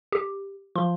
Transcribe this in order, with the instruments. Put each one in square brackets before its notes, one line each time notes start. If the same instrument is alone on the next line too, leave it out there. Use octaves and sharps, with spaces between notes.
[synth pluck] G4
[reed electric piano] F3 [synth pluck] C6